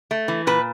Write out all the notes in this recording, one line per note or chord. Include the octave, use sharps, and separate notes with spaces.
A3
E3
A#2 B4